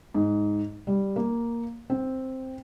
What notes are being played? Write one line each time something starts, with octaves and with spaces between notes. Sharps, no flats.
G#2
G3
A#3
C4